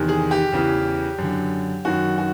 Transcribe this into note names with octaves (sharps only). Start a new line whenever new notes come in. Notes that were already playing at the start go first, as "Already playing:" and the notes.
Already playing: E2 C3 D#3
G#4
G4
E2 C#3 E3
F#2 D3
F#2 D#3 F#4
F#4